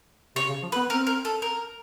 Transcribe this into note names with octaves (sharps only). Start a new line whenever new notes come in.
C3 C#5
C#3
F3
B4
B3
C4 A#4
A#4
A4
A#4